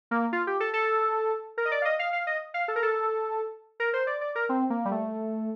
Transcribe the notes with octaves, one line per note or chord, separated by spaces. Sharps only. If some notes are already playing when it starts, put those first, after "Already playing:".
A#3
F4
G4
A4
A4
A#4
D#5
D5
F5
D#5
F5
F5
D#5
F5
A4
A#4
A4
A#4
C5
D5
D5
A#4
C4
A#3
G3
A3